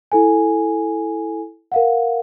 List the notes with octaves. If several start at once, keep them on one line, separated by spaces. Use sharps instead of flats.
E4 A4 G#5
A#4 F5 F#5